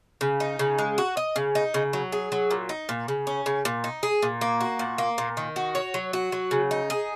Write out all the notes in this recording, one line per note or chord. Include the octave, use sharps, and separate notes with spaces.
C#3
D#4
C#3
G#3
F#4
D#5
C#3
D#4
C#3
F#3
G#4
F#3
A#2
D#4
A#2
C#3
C#4
C#3
A#2
D#4
G#4
A#2
A#3
F#4
A#2
A#3
A#2
D#3
F#4
C#5
F#3
F#4
F#3
C#3
D#4
G#4